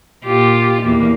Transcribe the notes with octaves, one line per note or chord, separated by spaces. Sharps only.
A#2 F4 G4
E2 A#3